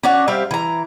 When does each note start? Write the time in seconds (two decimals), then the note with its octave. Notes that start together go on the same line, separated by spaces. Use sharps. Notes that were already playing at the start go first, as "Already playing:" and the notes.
0.03 C#4 D4 F#4 C#5
0.28 G3 C4 E5 F5
0.51 E3 A#5